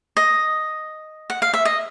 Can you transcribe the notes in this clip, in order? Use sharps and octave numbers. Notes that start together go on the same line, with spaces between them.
D#5
F#5
F5
E5
D#5